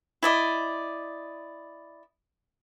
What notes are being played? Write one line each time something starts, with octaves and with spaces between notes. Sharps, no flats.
E4 D5 D#5